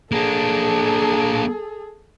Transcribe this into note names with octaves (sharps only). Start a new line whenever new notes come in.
A#3 D4 G#4 A4